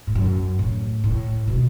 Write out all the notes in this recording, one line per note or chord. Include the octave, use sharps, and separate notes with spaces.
A2
F#2
A2
A2
B2